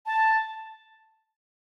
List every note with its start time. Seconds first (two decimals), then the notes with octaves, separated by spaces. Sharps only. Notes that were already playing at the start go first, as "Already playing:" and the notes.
0.06 A5